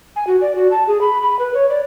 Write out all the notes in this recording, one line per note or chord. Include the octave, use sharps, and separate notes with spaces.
G#5
F#4
D5
F#4
A5
G#4
B5
B5
B4
C#5
D5